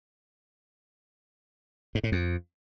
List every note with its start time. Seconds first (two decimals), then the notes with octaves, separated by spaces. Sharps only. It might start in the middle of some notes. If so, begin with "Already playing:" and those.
1.95 G#2
2.04 A2
2.12 F2